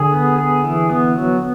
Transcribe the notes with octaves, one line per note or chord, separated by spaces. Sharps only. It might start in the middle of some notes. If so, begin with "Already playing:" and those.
Already playing: D3 G#4
B3
G#4
E3
B3
F#3